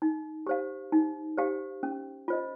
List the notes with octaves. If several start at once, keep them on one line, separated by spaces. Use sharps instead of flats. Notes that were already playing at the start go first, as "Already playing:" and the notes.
D#4
G4 C5 F5
D#4
G4 C5 F5
C#4
F4 C5 D#5